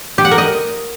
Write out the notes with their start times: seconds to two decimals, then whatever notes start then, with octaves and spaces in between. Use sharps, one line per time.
0.18 G4
0.25 F#5
0.31 A#4
0.38 D#5